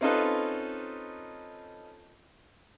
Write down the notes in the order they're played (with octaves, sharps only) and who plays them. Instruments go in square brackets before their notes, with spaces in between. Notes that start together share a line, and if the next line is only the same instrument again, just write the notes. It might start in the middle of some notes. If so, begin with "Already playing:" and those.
[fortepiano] C4 C#4 D#4 F4 A4 B4